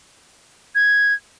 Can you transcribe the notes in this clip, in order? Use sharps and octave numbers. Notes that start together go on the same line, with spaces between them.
G#6